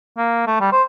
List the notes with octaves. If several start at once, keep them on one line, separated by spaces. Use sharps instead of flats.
A#3
A3
G3
C5